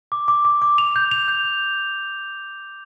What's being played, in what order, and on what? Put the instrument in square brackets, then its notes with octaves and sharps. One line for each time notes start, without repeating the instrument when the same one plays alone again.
[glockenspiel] D6
D6
D6
D6
F7
G6
F7
G6